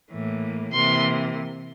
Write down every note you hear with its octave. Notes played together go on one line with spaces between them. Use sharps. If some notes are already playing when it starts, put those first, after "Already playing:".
A2 E3 A#3
C3 E3 A#3 C6